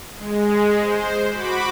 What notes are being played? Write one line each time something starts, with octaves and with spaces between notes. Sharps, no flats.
G#3
C5
F#4 B5 D6